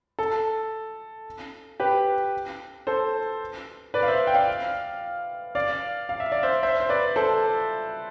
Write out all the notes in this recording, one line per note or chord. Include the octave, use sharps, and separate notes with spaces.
A4
G4 B4
A4 C5
B4 D5
F5
C5 E5
G5
D5 F5
D5 F5
F5
E5
D5
C5 E5
C5 E5
C5
B4 D5
A4 C5